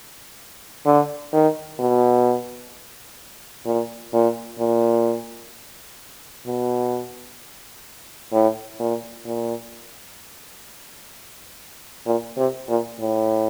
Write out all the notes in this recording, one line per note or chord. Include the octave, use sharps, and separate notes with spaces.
D3
D#3
B2
A#2
A#2
A#2
B2
A2
A#2
A#2
A#2
C3
A#2
A2